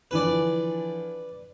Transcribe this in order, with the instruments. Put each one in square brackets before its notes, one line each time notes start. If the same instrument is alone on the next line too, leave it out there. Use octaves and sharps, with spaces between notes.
[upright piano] D3 E3 F3 [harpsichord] B4 D5